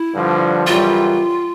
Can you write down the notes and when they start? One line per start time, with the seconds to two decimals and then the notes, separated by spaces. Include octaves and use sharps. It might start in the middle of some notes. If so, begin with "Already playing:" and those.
Already playing: E4
0.14 G2 D3 F3
0.67 F#2 C#3 E3 G3 F4